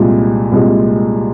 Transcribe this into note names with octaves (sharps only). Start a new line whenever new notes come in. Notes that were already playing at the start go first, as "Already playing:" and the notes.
Already playing: C2 A#2 G#3
C2 A#2 G#3